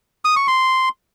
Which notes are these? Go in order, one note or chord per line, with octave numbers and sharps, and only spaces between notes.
D#6
C#6
C6